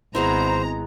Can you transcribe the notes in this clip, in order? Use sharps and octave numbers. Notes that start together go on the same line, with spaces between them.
G#1 G#3 B3 E4 C5 A#5